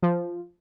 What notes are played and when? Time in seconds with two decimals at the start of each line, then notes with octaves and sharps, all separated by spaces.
0.03 F3